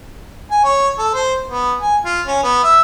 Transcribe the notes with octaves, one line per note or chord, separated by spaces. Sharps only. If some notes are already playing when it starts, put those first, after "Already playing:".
G#5
C#5
A4
C5
B3
G#5
F4
C#4
B3
E5